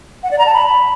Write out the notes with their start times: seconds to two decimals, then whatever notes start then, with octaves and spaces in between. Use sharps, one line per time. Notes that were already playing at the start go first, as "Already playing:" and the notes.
0.23 F#5
0.31 D5
0.39 A#5
0.46 A5
0.54 B5